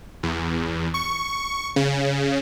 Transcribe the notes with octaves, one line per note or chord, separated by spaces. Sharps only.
E2
C#6
C#3